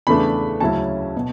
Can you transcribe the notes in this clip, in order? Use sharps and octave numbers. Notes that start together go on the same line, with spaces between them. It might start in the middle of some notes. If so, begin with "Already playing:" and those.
E2 C#3 E3 A3 D4 B5
D2 C#3 F#3 C#4 E4 A5
B2